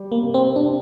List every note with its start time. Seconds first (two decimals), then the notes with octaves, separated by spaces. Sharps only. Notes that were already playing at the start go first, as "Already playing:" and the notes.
Already playing: G3
0.12 A#3
0.23 C3
0.34 C4
0.56 C3 D4